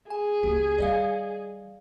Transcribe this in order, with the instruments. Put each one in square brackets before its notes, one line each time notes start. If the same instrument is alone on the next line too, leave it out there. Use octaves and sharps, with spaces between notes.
[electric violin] G#4 [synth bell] G#5
[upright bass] C#2 A#3 [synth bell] G4
[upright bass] D#3 G3 [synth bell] D5 D#5 F5